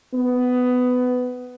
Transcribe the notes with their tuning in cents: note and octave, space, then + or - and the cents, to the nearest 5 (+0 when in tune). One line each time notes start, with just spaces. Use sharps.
B3 +15